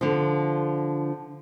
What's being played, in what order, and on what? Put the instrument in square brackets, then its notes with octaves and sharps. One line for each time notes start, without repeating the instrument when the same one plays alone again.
[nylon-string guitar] D3 F3